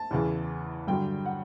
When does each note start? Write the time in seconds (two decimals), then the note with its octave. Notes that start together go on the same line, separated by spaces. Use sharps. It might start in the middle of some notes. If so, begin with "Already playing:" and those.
Already playing: A5
0.11 E2 C#3 E3
0.87 G2 D3 F#3 G5
1.26 F#5